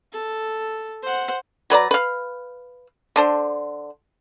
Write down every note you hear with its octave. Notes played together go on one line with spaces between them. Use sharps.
A4
C5 F#5
F#3 B4 D5 A#5
B4 F5
D3 D4 C5